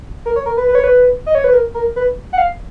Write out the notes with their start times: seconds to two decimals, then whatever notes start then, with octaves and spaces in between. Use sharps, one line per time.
0.26 A#4
0.36 C#5
0.46 A#4
0.57 B4
0.68 B4
0.75 C#5
0.84 B4
1.26 D#5
1.35 C#5
1.44 B4
1.53 A#4
1.74 A#4
1.96 B4
2.33 F#5
2.38 F5